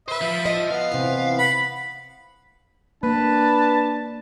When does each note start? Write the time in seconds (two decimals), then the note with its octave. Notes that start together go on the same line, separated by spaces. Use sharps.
0.08 B4 C5 E5
0.22 F3
0.46 D#5
0.71 B3 F5
0.92 C3 E3
1.39 F#5 B5
3.03 A#3 D4 B4 A5